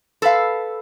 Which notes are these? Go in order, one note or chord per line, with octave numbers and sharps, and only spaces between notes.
A4 B4 F5